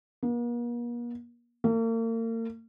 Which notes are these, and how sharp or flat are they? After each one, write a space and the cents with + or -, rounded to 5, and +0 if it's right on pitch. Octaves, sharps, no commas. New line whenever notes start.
A#3 +45
A#3 -40